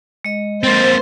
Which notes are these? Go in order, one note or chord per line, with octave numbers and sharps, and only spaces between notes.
G#3 D#5
A#3 C4 C5 A6